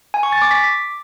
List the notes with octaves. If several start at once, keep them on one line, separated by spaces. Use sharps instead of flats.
G#5
C#6
A6
D6
B6